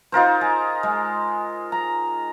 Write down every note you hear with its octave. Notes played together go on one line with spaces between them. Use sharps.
D#4 F4 A#4 C5
G#4
G#3
A#5